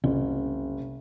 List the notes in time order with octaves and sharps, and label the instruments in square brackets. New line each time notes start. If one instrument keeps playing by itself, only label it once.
[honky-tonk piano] F#1 [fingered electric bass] C2